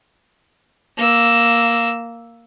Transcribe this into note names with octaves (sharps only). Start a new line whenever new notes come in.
A#3 E6